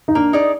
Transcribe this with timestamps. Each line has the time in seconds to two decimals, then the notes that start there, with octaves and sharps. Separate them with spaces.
0.08 D#4
0.15 A#3 D4
0.33 D#4 G#4 D5